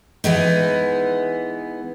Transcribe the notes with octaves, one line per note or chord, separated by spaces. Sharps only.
E3 G#3 B3 D#4